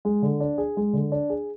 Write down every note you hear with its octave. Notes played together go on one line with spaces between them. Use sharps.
G#3
D3
D4
G#4
G#3
D3
D4
G#4